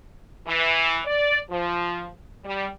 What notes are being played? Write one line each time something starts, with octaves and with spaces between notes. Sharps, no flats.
E3
D5
F3
G3